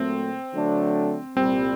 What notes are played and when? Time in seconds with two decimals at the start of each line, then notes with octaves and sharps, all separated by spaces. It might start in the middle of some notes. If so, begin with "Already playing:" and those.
Already playing: A#2 F#3 A3 C4
0.53 D3 F#3 A3 D4
1.37 C2 A#2 G3 C4